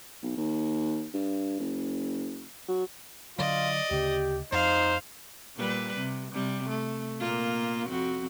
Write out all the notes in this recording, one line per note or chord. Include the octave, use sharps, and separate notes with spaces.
B1
D#2
G2
F#1
F#3
D3 F#3 F4 D5 D#5
D2 C#3 G4
F2 D#4 C5 F5
A#2 G3 B4
C3
C3 G3
A3
A#2 A#3 F4
F2 C4 F#4